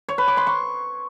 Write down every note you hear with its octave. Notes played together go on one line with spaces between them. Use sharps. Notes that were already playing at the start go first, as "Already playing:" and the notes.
C#5
B4
D6
C6
C#6